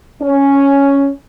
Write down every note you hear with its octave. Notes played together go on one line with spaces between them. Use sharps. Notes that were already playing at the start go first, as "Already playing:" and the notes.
C#4